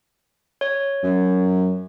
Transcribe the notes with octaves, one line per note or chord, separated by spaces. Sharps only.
C#5
F#2